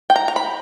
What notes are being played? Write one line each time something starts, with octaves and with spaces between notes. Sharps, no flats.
G5
A#5
A#5
B5